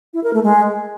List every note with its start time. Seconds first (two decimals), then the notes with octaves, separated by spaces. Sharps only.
0.13 E4
0.23 A#4
0.33 A3
0.43 G#3